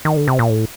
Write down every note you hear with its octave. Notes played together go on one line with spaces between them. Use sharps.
D#3
D3
C3
A#2
A2